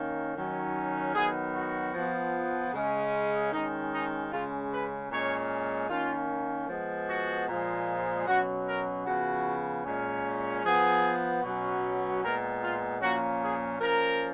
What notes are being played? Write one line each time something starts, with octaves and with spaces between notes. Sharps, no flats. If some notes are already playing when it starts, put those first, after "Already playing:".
Already playing: D#3 A#3 C#4
D#3 F#3 C#4
D#3 F#3 B3 G#4
F#4
F3 B3
C#3 G#3 C#4
D#3 G#3 C#4 D#4
D#4
C#3 G#3 C#4 F4
B4
A#2 G#3 C#4 C#5
D#3 A#3 C#4 F4
F3 G#3 B3
F#4
A#2 F3 G#3
B2 F#3 C#4 F#4
A#4
C#3 F3 B3 F#4
A#2 G#3 C#4
F3 B3 G#4
B2 F#3 C#4
A#2 G#3 B3 A#4
F4
A#2 F3 A#3 C#4 F#4
G#4
F3 A#3 C#4 A#4